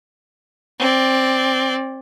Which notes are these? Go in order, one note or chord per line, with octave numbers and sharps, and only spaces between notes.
C4 D5